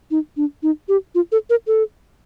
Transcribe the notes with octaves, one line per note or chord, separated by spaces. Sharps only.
D#4
D4
D#4
G4
F4
A4
A#4
A4